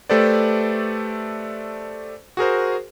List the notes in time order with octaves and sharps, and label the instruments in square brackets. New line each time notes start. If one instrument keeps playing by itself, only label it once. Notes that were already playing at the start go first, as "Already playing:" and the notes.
[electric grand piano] A3 G4 A4 B4 C5 D5
F#4 G#4 A#4 C5